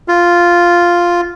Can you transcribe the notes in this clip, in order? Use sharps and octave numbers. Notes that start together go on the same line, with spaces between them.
F4